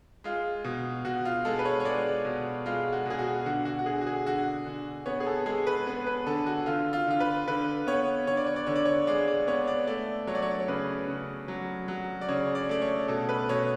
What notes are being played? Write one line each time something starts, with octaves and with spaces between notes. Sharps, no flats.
G#3 F4
B2
B2 F#4
F4
G#3 A4
B4
C#5
C#5
G#3 D5
B2
G#3 F4
F#4
B2 G#4
F#4
D3 F#4
F#4
F#4
D3 G#4
F#4
G#4
D3 F#4
D3
B3 C#5
G#4
A4
G#3 G#4
B4
B3
B4
D3 A4
F#4
D3 F4
F4
D3 F4
B4
D3 B4
B3 C#5
D3 C#5
D5
C#5
D5
D3 C#5
D5
C#5
G#3 D5
D5
B3 C#5
D5
A3 D5
F#3 C#5
D5
C#5
D5
C#5
C#3 B4
C#3
F#3
F#3
D5
C#3 C#5
D5
A3 D5
C#5
B2 A4
B4
B2 C#5